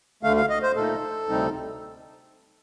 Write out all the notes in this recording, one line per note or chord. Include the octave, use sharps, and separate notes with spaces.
D2 D3 A3 F5
F5
D#5
C5
A#2 A3 D#4 A4
D2 C3 G3 C4 D#4